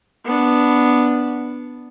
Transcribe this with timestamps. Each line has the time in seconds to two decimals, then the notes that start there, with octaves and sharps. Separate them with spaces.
0.25 B3 D4